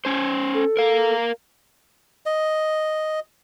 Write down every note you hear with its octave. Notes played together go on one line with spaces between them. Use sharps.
C#4 C5
A4
A#4 F5
D#5